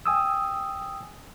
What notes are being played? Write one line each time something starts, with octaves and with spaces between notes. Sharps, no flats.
G5 G#5 D#6 E6